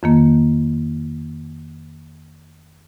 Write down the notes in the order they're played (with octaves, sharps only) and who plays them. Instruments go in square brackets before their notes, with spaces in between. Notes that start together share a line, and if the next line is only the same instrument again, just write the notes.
[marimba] F2 D#3 A#3